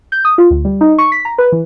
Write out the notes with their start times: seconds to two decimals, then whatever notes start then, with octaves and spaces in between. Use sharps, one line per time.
0.12 G6
0.25 D#6
0.38 F4
0.51 D2
0.65 G3
0.81 D#4
0.98 C#6
1.12 B6
1.25 A#5
1.38 B4
1.52 E3